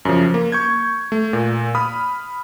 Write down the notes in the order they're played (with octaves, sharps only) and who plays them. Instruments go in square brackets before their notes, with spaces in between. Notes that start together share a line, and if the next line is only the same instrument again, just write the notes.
[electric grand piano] F#2 C#3 F3
A#3
C#6 G6 G#6
A3
A#2
B5 D#6 F6